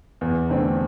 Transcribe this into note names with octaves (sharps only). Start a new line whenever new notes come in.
E2
D3 A3 C4